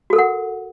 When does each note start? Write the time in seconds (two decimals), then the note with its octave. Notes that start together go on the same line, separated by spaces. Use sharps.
0.10 F#4
0.13 A4
0.16 A#4
0.18 F#5